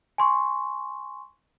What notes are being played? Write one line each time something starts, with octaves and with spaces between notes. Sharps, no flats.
G#5 C6 C#6